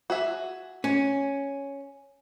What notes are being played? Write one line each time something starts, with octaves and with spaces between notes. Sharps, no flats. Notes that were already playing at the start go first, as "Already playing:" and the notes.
F#4 G#4 E5
C#4